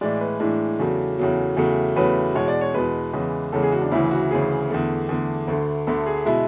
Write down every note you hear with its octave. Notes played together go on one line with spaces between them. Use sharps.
A2 E3 G#3 D5
B4
A2 E3 G#3 D4
E2 C#3 F#3 A3
E2 C#3 F#3 A3
E2 C#3 F#3 A3
E2 C#3 F#3 A3 B4
E2 B2 G#3 C#5
D5
C#5
E2 B2 G#3 B4
E2 C#3 E3 G#3
E2 C#3 E3 G#3 A4
G#4
F#4
D4
D2 C#3 E3 E4
F#4
D2 C#3 E3 G#4
E2 D3 A3
E2 D3 A3
D2 D3 A3
D2 D3 A3 A4
G#4
B2 G#3 E4